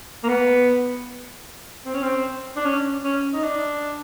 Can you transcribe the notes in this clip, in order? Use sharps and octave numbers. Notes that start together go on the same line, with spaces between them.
A#3
B3
C4
C#4
C4
D4
C#4
C#4
D#4
D4